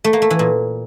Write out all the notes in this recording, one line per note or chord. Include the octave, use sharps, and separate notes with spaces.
A3
A#3
A3
E3
A#2